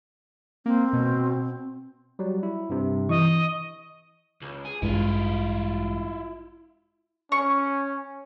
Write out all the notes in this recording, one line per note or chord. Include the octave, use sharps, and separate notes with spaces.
A#3 C4
B2
F#3 G3
E4
G2 C3
E3 D#5 C#6
C#2
G#4
A1 G2 G#3 E4 F4
C#4 C#6